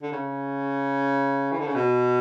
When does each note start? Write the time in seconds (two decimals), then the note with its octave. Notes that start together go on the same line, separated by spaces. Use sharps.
0.02 D3
0.12 C#3
1.52 E3
1.60 D3
1.67 C#3
1.75 B2